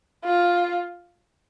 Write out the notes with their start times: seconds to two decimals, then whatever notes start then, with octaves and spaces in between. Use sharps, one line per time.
0.25 F4